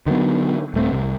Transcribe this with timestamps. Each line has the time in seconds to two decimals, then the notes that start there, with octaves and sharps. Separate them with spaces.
0.06 D3 D#3 F#3 B3
0.74 D#1 A3 C4
0.92 C2